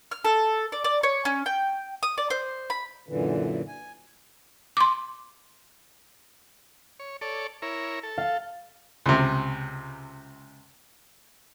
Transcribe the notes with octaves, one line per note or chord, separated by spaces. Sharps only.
F6
A4
D5
D5
C#5
C#4
G5
D#6
D5
C5
B5
F#2 A#2 D3 E3
G#5
C6 D6
C#5
A4 C#5 D5
E4 A#4 C#5
A4
F5
C#2 C3